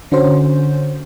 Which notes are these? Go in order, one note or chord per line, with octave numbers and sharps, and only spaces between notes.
D3 C#4 F#4 C5